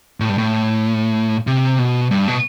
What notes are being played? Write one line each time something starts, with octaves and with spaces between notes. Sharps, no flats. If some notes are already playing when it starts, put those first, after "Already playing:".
A2
G2
A2
C3
B2
G2
B2